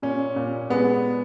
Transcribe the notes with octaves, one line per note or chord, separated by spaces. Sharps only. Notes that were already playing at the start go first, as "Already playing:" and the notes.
A#2 C#4
A#2
G#3 B3